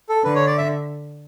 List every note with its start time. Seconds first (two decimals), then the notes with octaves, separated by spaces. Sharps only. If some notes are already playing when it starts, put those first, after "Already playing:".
0.09 A4
0.24 D3 B4
0.35 C#5
0.46 D5
0.58 E5